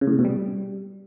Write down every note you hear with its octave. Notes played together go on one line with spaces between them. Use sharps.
C#3
A2
C3
B2
G3